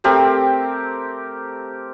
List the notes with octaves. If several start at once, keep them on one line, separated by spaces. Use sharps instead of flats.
A3 C4 G4 A#4